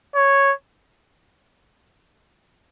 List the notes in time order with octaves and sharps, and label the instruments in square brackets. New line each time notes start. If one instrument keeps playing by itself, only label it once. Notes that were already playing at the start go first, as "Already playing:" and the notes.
[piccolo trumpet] C#5